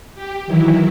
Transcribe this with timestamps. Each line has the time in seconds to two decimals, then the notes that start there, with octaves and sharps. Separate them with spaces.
0.15 G4
0.47 D#3 E3 F#3 E4